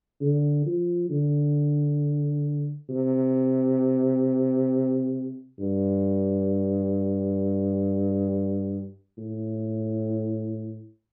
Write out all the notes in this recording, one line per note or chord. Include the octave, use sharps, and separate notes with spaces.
D3
F3
D3
C3
G2
A2